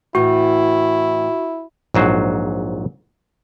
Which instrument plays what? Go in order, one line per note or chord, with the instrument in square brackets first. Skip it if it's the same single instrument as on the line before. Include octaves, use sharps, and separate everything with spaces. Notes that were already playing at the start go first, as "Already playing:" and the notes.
[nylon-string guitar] A2 E3 [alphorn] E4 [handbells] F#4
[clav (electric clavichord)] A#1 G#2 F#3 C5